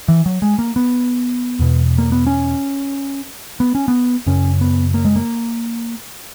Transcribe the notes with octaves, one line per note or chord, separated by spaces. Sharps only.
E3
F#3
G#3
A#3
B3
E2 B2
A#3
B3
C#4
B3
C#4
B3
F#2 C#3 C#4
B3
A#3
G#3
A#3